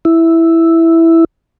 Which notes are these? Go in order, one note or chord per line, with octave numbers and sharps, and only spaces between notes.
E4